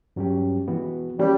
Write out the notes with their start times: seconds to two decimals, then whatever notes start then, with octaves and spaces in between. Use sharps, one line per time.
0.16 G2 F#3 C#4 G4
0.68 E3 B3 F#4
1.19 E3 G3 A#3 C#4 G4